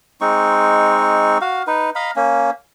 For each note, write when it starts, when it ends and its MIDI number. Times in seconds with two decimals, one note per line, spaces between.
0.21 1.38 56
0.21 1.38 60
0.21 1.38 63
0.21 1.38 85
1.41 1.63 66
1.41 1.63 77
1.67 1.90 63
1.67 1.90 71
1.95 2.11 75
1.95 2.11 77
1.95 2.11 82
1.95 2.11 83
2.16 2.50 58
2.16 2.50 61